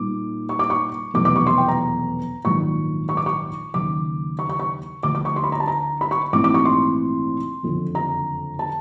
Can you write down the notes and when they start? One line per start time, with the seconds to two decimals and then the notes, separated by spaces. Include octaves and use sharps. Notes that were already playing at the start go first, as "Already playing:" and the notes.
Already playing: A#2 G3 A#3 D#4 D6
0.49 C#6
0.59 D6
0.70 C#6
1.14 F1 E2 B2 F#3 D6
1.25 D6
1.36 C#6
1.47 C6
1.58 G5
1.68 A#5
2.45 A#1 G#2 D#3 F#3 C#6
3.09 C#6
3.17 D6
3.26 C#6
3.74 D#2 C#3 F#3 D6
4.39 C#6
4.49 C#6
4.59 C#6
5.03 D2 D3 F3 D6
5.15 D6
5.25 C#6
5.36 C6
5.44 B5
5.52 A#5
5.60 A5
5.68 A#5
6.01 B5
6.11 C#6
6.32 A#1 G#2 E3 A3 C4 D6
6.44 D6
6.54 C#6
6.65 C6
7.63 F#1 F2 D3
7.95 A#5
8.59 A5